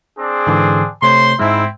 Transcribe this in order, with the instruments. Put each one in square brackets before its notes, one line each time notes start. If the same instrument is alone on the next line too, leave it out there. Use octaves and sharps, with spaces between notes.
[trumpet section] C4 D4 G#4
[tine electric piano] G#2 D3 E3
[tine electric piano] C3 A3 C#5 [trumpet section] C5 C6
[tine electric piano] G#2 G#3 [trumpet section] C4 E4